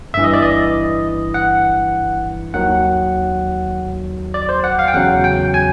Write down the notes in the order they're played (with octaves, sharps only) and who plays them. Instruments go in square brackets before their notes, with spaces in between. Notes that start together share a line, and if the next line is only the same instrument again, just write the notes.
[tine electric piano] G1 G2 E3 E5
D#5
D5
D#5
F#5
D#2 D#3 F#3 F#5
D5
C5
F#5
F5
G5
E2 C#3 F#3 F#5
G5
G#5